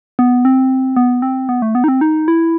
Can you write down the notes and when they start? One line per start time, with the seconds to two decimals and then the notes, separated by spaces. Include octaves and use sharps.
0.19 B3
0.45 C4
0.96 B3
1.22 C4
1.49 B3
1.62 A3
1.75 B3
1.84 D#4
1.88 C4
2.01 D#4
2.28 E4